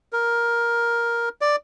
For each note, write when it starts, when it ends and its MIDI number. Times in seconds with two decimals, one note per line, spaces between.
0.13 1.29 70
1.41 1.56 74